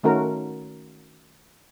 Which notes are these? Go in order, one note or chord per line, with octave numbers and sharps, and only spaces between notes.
D#3 A3 C#4 F#4 A#4